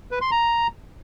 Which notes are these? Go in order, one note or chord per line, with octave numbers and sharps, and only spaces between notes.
B4
C6
A#5